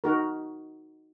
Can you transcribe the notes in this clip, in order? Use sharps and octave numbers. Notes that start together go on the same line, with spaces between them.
D#4 F#4 A#4